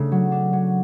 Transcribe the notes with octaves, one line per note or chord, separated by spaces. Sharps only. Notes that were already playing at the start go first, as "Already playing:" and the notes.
Already playing: C#3 A3 D4
F#3
D4
F#3